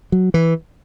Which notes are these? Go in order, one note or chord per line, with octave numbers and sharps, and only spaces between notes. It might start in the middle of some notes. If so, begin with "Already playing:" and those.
F#3
E3